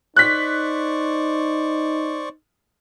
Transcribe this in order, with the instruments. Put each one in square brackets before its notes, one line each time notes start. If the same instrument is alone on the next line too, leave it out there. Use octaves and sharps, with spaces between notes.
[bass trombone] D#4 [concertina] C5 D5 C#6 [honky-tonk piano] F#6 B6